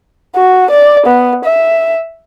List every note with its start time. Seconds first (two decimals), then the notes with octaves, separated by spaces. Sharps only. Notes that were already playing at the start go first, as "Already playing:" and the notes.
0.36 F#4
0.70 D5
1.07 B3
1.45 E5